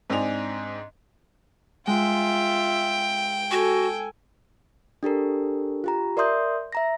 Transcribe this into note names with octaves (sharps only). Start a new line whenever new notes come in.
G#2 C4 D4 D#5 G#5 F7
G#3 F4 E5 G5
F#4 A4 G#5
D4 G4 A4 A#4
F4 G4 A#5
A#4 D5 E5 C6 D#6 G6
E5 A#5 A#6